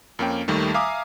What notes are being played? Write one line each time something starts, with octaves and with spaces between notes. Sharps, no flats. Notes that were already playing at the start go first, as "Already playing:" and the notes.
F2 A#3 C#4 G5
D#2 D#3 G3 A3
E5 F5 G#5 A#5 D6 D#6